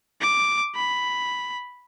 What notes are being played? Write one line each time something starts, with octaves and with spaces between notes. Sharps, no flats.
D6
B5